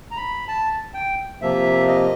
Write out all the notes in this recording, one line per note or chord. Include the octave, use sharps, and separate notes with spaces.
A#5
B5
A5
G5
C3 F3 A#3 E5
D#5